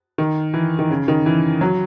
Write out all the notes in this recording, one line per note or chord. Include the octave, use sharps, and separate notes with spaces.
D#3
E3
D#3
C#3
D#3
E3
F#3